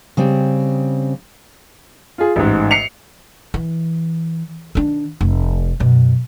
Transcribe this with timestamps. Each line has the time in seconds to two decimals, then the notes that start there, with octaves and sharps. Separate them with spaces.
0.17 C#3 G3 C4
2.18 F4 G#4
2.36 A1 G#2
2.71 C7 C#7 F7
3.54 E3
4.75 D#3 D4
5.21 F1
5.80 F#2 B2